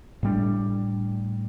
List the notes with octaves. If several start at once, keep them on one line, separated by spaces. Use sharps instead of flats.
A2 G3 D4